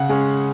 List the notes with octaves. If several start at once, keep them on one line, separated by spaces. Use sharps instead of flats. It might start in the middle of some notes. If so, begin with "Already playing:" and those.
Already playing: C#3 F#5
G#3 C#4